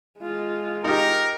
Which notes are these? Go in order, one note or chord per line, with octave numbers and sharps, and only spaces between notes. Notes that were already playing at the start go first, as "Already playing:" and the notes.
G#3 F4
D#4 G4 A#4